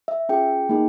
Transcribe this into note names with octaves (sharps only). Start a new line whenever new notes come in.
E5
C#4 F4 G#4 G5
A#3 D#4 G#4